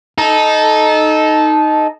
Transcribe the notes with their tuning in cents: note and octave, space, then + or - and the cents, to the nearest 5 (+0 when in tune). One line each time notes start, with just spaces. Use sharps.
D#4 +0 A4 -20